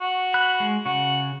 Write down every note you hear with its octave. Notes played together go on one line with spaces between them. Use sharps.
F#4
B5 F#6
G#3
C#3 F#4